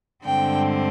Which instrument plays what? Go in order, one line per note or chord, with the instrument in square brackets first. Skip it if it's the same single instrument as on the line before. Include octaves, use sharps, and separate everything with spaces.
[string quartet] G2 D3 G#3 C4 G5